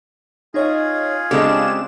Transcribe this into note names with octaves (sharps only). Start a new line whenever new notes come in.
C#4 D#4 F4 G#4 C#5 D#5
C#3 G#3 C4 D4 G4 A4 G#6 E7